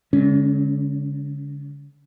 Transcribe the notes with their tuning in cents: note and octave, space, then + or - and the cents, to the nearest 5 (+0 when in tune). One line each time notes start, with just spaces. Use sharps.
D3 -45 G#3 -10 C#4 +0